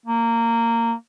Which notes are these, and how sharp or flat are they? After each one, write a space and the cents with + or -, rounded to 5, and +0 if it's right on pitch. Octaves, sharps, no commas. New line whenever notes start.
A#3 -15